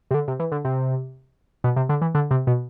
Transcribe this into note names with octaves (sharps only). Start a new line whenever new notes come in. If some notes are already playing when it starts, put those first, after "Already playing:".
C3
D3
C3
E3
D3
C3
B2
C3
D3
E3
D3
C3
B2